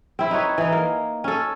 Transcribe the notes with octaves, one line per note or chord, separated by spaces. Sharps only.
C4 E4
D#4 B4 C#5
E3 D#4
A#3
C#4 A4